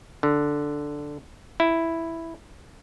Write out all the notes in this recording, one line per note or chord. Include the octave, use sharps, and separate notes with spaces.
D3
E4